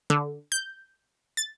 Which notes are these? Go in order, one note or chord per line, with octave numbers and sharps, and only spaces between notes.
D3
G6
A6